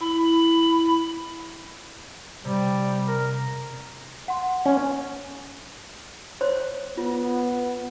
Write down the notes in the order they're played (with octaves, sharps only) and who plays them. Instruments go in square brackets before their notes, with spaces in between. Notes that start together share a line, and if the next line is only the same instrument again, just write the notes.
[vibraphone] E4 [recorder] B5
[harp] C3 [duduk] G3
[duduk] A#4
[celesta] F#5 C6
[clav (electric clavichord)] C#4
[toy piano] C5 C#5 C6
[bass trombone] B3 [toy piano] F4